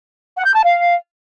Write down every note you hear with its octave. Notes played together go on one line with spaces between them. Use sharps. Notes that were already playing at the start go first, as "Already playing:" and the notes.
F#5
G6
A5
F5